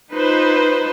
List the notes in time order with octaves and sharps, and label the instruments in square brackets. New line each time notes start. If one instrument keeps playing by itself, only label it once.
[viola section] D#4 F4 B4 C5